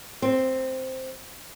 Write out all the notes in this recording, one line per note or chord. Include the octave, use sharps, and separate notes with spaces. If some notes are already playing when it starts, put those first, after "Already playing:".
C4